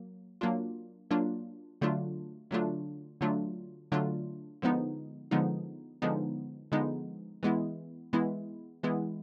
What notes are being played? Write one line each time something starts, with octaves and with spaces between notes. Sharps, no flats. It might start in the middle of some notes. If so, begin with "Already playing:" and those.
Already playing: F#3 A#3
F#3 A#3 D4 F4
F#3 A#3 D4 F4
D3 F#3 A3 D4 F4
D3 F#3 A3 D4 F4
D3 F#3 A3 D4 F4
D3 F#3 A3 D4 F4
D3 F3 G#3 B3 D#4
D3 F3 G#3 B3 D#4
D3 F3 G#3 B3 D#4
D3 F3 G#3 B3 D#4
E3 G#3 B3 E4
E3 G#3 B3 E4
E3 G#3 B3 E4